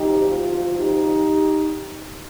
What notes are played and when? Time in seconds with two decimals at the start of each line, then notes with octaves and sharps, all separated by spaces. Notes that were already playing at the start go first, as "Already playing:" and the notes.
Already playing: D2 C3 F3 D#4 G4
0.28 F4
0.77 D#4 G4